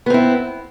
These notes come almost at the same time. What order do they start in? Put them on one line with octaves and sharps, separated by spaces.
B3 C4 E4